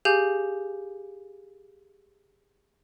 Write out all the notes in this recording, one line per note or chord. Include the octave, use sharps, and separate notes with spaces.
G4 G#4 F5 G#5 G6